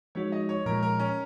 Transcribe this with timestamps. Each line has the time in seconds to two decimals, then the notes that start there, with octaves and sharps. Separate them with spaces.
0.15 F3 G#3 D#4 F#4 C#5
0.32 D#5
0.49 C#5
0.66 A#2 F3 G#3 A#4
0.83 A#4
1.00 C#4